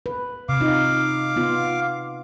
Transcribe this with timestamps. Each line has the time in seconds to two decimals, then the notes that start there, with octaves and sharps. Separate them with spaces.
0.06 B4
0.49 C3 F5 D6
0.61 D#4 F4
1.36 B3 F4